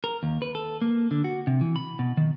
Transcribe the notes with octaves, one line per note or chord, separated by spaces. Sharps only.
A#4
D#2
B4
A4
A#3
D3
F#4
C3
E3
B5
B2
D#3